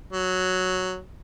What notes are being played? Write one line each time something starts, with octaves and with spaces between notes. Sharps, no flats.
F#3